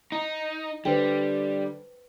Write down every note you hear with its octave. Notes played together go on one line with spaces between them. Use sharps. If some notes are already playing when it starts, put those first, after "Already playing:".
D#4
D3 G3 B4 C5 G5